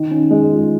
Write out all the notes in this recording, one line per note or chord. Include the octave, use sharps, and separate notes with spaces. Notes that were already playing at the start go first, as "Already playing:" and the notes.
Already playing: D#3
C#4
G#3
F4